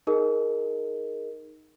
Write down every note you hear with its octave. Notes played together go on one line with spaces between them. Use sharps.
D#4 G#4 A#4 D#5